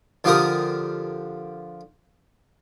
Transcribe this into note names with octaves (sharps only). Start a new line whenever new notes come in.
D3 F3 F4 G4 A#4 D#6